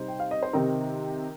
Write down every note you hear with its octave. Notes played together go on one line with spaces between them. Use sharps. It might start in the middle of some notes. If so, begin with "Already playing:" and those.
Already playing: C3 G3 D#4 C5
G5
F5
D#5
C5
C3 D#3 C4 D#4 A#4